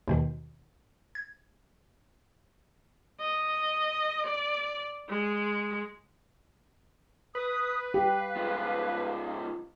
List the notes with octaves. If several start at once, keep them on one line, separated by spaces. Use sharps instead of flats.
D#2 B2 D#3
G#6
D#5
D5
G#3
B4 D#6
G4 F5
G#2 F3